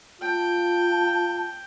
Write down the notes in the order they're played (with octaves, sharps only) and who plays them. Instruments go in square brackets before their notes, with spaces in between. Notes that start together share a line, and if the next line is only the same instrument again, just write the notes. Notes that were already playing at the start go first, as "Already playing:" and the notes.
[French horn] F4 [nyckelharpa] G5 [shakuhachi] A5